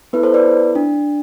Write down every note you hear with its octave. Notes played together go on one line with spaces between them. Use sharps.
B3 E4 A4 B4
A4 C5
B4 D5
D4